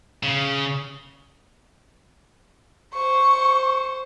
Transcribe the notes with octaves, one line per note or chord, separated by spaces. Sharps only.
C#3
C5 C#6